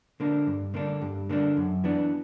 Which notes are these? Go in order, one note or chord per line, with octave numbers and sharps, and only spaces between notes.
D3 A#3 D4
G2
D3 A#3 D4
G2
D3 A#3 D4
F#2
E3 B3 D4